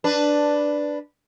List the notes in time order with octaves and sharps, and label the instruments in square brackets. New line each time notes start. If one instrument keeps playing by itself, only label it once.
[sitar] D4 B4